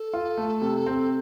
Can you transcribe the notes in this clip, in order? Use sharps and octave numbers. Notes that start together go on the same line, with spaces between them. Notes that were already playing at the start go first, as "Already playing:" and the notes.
Already playing: A4
F4
A3
C3
C4